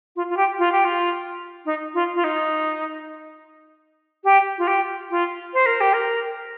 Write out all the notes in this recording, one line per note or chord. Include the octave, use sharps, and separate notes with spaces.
F4
F4
G4
F4
G4
F4
D#4
F4
F4
D#4
G4
F4
G4
F4
C5
A#4
G4
A#4